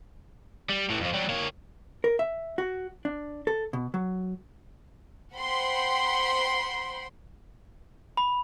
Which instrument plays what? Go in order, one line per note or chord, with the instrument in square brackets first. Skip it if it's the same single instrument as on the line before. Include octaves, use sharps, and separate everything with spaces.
[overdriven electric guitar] G3
A2 E3
F2 F3
F#3 G3
A#3 C#5
[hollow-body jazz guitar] A#4
E5
F#4
D4
A4
B2
F#3
[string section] C5 F#5 G5 B5 C6
[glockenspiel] B5